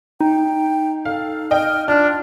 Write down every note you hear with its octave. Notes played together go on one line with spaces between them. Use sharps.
D#4 G5
A4 F5
D#5 G5 F6
D4 F4 F6